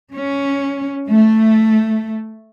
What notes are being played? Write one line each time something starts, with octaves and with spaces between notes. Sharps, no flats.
C#4
A3